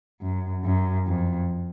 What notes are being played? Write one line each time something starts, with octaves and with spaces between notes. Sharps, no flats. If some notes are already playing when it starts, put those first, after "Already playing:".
F#2
F#2
F2